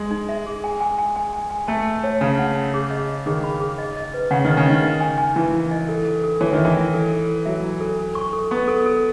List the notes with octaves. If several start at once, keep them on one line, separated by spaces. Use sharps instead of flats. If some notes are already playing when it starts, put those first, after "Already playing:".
Already playing: G#3
D#4
E5
G#4
G#5
G#5
G#5
G#5
G#5
G#5
A3 A5
A5
C#5
C#3 A5
F#5
A5
G#4
D#5
D#5
D#3 G#4
B5
G#4
D#5
D#5
B4
C#3 F#5
D#3 D#5
C#3
D#3 D#5
D#5
G#5
G#5
E3 E4
E4
D#5
A4
A4
A4
E3 C#5
D#3
E5
E3
E5
A4
A4
A4
F#3 E5
E4
A4
A4
C#6
A4
B3 C#6
A4
A4